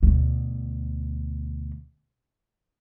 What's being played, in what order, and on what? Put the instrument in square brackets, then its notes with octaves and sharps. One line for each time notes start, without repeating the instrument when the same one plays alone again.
[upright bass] D2 B2